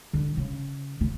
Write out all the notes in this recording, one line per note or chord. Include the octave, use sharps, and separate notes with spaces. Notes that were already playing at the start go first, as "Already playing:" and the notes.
D3
C#3
C#3